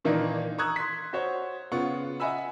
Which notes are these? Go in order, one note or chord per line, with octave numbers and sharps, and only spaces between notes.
A#2 D#3 E3 A#3 D4 D#4
A#5 C#6 D#6 E6 F#6 G#6
C6 B6
F#4 C5 C#5
C#3 B3 F4 F#5 C#6
D#5 E5 F#5 G#5 B5 E6